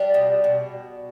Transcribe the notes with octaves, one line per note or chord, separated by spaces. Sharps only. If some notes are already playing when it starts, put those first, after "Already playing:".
Already playing: G3 D4 G4
B2
B2